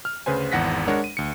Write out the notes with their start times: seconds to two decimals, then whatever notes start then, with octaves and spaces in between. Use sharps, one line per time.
0.05 F6
0.26 D2 C#3 B4 C5 G#5
0.52 G#1 E2 F#5 A#6 B6
0.88 G#3 D4 A#4 C#5 F#5
1.04 D#7
1.17 D2 C#7